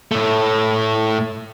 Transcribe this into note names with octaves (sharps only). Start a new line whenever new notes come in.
A2 A3